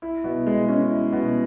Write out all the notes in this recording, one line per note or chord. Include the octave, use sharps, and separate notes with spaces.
E4
B2
G#3
C#4
E4
B2